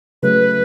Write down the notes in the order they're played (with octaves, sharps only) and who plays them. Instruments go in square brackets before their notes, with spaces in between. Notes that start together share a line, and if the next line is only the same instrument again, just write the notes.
[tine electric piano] C#3 F#3 A3 [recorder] B4